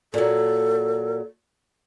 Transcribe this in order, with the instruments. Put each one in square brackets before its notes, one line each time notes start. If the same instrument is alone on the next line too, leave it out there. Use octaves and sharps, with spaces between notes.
[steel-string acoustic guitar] A#2 F#3 [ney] A4